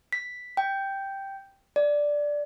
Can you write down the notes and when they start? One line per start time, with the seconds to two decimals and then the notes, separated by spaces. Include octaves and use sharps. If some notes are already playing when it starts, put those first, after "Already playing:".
0.13 B6
0.57 G5
1.76 D5